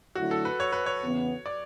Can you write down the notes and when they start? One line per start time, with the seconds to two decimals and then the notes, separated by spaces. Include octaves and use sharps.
0.15 D3 F#3 A3 E4 F#4
0.31 A4
0.45 B4
0.60 C#5
0.72 B4
0.86 C#5
1.02 E2 C#3 E3 B3
1.46 D5